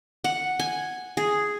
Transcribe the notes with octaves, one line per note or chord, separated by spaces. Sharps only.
F#5
G#5
G#4